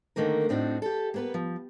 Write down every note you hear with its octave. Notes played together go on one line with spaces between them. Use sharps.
D3 D#3 A3 A#3 A#4
A2 C4 D4 D#4 F#4
G4 A4
A#3 B3 B4
F3